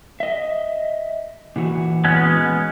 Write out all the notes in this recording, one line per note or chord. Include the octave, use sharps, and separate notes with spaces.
D#5 E5
A#2 E3 F#4
G#3 B3 C#4